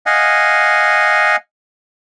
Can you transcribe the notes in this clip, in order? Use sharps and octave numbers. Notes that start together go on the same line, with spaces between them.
D#5 F5 F#5 G#5